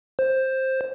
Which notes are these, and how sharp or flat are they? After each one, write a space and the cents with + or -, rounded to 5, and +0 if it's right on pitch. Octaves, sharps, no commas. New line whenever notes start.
C5 +10